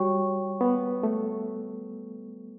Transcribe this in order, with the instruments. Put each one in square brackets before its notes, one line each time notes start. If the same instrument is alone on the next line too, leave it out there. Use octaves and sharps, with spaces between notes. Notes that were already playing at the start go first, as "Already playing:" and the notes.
Already playing: [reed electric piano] G3 [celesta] F#4 C#5 G5 C#6
[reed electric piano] B3
A3